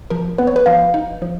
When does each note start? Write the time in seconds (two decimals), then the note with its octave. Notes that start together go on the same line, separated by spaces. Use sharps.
0.10 F3 A#4
0.38 B3 B4
0.47 C#5
0.56 B4
0.66 F3 F5
0.94 D#4
1.22 F3